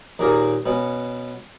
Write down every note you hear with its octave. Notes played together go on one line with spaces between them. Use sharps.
D#2 A#2 A#3 G#4 A#4
B2 B3 C#4